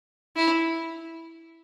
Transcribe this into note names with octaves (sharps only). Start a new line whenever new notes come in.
E4